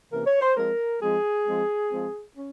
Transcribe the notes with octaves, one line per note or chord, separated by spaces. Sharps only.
C3 E3 A#3 C#4 A#4
C#5
C5
F3 G#3 C4 A#4
F3 G#3 C4 G#4
F3 G#3 C4
F3 G#3 C4
C#4